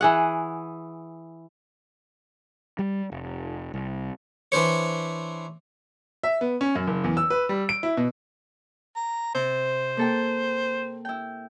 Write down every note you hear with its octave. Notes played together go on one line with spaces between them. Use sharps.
E3 G#4 F#5
G3
F1
C2
E3 D4 C5 C#5
E5
B3
C#4
F#2
F#1
E2
E6
B4
G3
D7
E4
B2
A#5
C3 C5
A#3 A4 G5
E4 G5